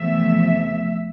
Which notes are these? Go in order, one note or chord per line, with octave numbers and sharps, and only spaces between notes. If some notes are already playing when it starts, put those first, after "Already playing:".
Already playing: E2 C3 F3 A3 E5